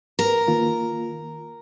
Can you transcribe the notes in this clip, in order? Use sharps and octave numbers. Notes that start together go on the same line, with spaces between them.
A#4
D#3 A#3 F4